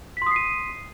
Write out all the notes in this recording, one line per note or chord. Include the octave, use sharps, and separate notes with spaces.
C6 D#6 B6 C7 D#7